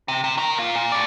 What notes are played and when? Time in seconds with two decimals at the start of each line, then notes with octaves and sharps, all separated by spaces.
0.08 C3
0.24 C3
0.38 D#3 A#4
0.58 A#3 F4
0.76 A#2
0.92 A2 D5